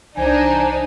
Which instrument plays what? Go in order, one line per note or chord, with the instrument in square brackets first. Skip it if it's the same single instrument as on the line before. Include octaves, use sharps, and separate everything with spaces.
[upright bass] C2 E3 [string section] D4 D#4 [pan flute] C5 [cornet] G#5